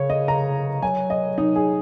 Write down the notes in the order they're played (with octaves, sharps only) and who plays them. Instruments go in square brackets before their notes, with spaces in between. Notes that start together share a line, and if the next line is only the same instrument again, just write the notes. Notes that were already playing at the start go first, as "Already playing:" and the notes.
Already playing: [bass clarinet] C#3 [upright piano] C#5
[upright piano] D#5
A#5
[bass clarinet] F#3 [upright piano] G#5
[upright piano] D#5
D#4
G#4